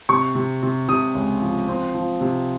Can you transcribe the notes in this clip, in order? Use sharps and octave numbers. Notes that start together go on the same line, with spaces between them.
C3 C#6
C3
C3
C3 D#6
C#2
F3
C4
F3
C3